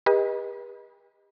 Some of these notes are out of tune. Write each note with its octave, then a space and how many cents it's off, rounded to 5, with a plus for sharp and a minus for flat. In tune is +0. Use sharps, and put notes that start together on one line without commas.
G4 +40 B4 -40 D#5 +10